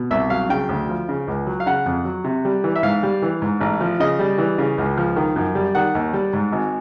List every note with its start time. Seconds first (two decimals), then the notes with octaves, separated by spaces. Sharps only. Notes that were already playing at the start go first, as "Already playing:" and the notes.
Already playing: B2
0.11 C2 E5
0.30 F#3 F5
0.50 C#3 G5
0.69 D2
0.89 F3
1.09 C#3
1.28 C#2
1.47 F#3
1.60 F5
1.66 C#3 F#5
1.86 F2
2.05 F#3
2.24 C3
2.45 G3
2.64 E3
2.76 E5
2.83 G#2 F5
3.03 G3
3.22 E3
3.42 G#2
3.61 A1
3.81 F3
4.00 C#3 D#5
4.19 G3
4.38 E3
4.58 C#3
4.78 C#2
4.97 F3
5.16 D#3
5.36 F#2
5.55 G3
5.75 D#3 F#5
5.95 D#2
6.13 G3
6.33 G#2
6.52 G#1